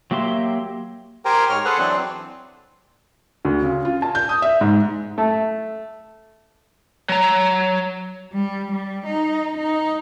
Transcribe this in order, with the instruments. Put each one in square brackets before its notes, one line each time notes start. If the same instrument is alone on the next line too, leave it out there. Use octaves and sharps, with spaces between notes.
[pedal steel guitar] F#3 A#3 G4 E5 C6
[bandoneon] G4 A#4 C5 G5 G#5 A#5
G#2 C#5 F6
G#4 A4 B4 C5 F#5
E3 F#3 C4 D4
[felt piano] D2
C#3
F4
A5
G6
D#6
E5
G#2
[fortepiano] A3
[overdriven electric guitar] F#3 A#5
[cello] G3
G3
D#4
D#4